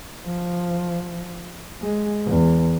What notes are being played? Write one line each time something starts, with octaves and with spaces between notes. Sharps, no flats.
F3
G#3
E2